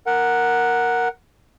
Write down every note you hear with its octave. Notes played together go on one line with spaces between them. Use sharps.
A#4 F#5